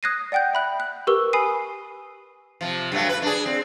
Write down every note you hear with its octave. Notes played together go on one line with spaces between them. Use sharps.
D#6 F#6 G#6 A#6 C7 D#7
D5 F#5 G5 F#6 G6
E5 B5 F#6
F#6
G4 A#4 B4 C#6 E6 G7
G#5 B5 D#6 C7 D#7
C3 F3
G2 F#3 A3
B4
D4 G#4
C4